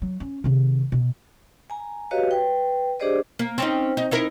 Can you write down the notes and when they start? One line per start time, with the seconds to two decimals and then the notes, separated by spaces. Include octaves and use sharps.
0.02 F#3
0.20 C#4
0.44 C3 D#3
0.92 B2
1.70 G#5 A#5
2.11 F#4 G4 B4 C#5 D#5 F5
2.31 B4 G5
3.00 D4 G4 G#4 C5 D5 D#5
3.39 A#3
3.58 C4 C#4 D#4
3.97 D#4
4.11 D#4 E4 A#4